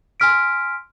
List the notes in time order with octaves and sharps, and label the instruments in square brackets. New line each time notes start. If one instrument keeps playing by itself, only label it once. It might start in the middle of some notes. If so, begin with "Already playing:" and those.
[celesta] G#5 C6 E6 F6 B6 D7